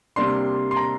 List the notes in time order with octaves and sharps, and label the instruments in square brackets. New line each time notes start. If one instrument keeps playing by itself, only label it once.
[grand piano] C3 G3 A#3 D4 C6
C6
A#5